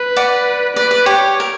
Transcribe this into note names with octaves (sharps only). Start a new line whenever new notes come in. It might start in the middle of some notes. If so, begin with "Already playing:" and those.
Already playing: B4
D5 F#5
B4 D5
D5
G4 C#5
A#4